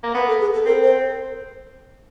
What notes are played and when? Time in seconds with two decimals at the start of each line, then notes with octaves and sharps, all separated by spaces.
0.03 A#3
0.14 B3 B4
0.28 A4
0.40 G#4
0.53 A4
0.66 C4 A#4
0.83 C5